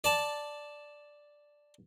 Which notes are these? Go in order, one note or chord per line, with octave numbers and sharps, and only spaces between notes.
D5 A5